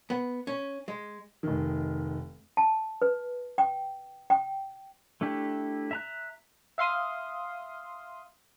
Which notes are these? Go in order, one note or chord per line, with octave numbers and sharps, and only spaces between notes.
B3
C#4
G#3
F1 D#3
A5
B4
G5
G5
A3 D4 E4 G4
E5 A#5 F#6
E5 F5 C6 D#6